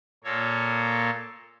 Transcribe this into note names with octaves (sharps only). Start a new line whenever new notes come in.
A#2 A#3 A4 C#5